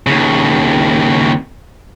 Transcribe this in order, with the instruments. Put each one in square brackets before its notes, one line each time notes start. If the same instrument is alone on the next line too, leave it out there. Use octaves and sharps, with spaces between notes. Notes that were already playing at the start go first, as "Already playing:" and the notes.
[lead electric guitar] D#2 C#3